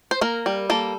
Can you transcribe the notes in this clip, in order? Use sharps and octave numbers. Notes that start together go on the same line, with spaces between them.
C5
A#3 A#4
G3
A#3 A4